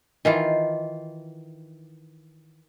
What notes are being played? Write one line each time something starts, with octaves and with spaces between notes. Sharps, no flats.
D#3 E3 F4